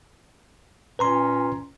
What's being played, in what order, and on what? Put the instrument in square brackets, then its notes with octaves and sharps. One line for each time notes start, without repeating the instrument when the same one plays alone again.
[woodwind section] A#2 C#4 [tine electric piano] B4 A#5 C6